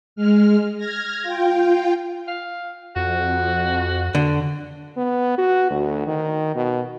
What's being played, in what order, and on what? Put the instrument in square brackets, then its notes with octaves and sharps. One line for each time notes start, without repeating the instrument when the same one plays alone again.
[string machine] G#3 F6
F6 G#6 A#6
F4 G5
[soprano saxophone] F5
[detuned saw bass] F2 [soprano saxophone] F#4
[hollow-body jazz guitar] D3
[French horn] B3
F#4
D2
D#3
B2